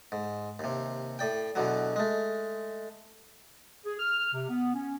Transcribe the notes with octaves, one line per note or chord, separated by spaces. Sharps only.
G#2
D#2 C3
A2 D5 G5
E2 B2 D3 F#3
G#3 A3
G#4
F6
C3
B3
C#4